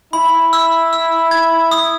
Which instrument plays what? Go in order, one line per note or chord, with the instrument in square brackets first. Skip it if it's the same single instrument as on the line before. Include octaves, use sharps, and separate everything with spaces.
[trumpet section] E4 [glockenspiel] B5
[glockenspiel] E6
E6
G#6
D#6